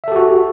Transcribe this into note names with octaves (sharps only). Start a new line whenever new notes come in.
F#4 G4 A4 E5